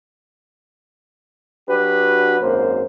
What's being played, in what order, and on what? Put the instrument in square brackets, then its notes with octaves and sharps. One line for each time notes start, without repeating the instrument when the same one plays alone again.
[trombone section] F#3 D4 F#4 G4 B4
G#1 F#2 A#3 C5